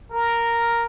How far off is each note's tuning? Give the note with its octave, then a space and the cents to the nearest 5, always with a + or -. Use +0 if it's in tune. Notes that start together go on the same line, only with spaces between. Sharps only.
A#4 +0